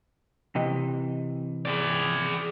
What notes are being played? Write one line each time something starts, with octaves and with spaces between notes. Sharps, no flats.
C3 E3 D#5
G#4 D5